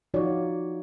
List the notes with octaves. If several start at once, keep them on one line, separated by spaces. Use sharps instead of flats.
F3 D#4 F4 F#4 C#5 D5